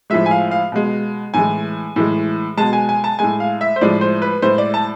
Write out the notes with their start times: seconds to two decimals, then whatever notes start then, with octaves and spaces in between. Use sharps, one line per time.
0.10 A2 F3 G#3 E5
0.26 G#5
0.31 F5
0.51 F5
0.72 B2 G#3
1.34 A2 E3 G#3 G#5
1.96 A2 E3 G#3
2.57 B2 G#3 A5
2.73 G#5
2.89 G#5
3.04 A5
3.19 A2 G#3 G#5
3.40 F5
3.61 E5
3.76 C5
3.81 A2 F3 G#3 D5
4.01 C5
4.22 B4
4.42 A2 G#3 C5
4.58 D5
4.74 A5